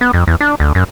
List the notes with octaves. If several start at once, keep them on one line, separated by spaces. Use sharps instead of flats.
B3
F2
E2
D4
D2
F#2